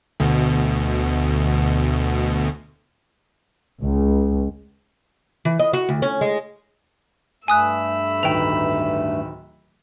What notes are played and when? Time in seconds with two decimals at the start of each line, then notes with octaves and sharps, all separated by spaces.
0.20 D2 B2
3.81 C#2
5.45 E3
5.59 D#5
5.73 F#4
5.89 D2
6.02 C#4
6.21 G#3
7.48 G2 A3 G#5 B5 D#6 E6 F#6
8.23 D1 D#3 B4 G5 F7